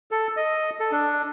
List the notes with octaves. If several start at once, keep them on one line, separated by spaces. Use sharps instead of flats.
A4
D#5
A4
D4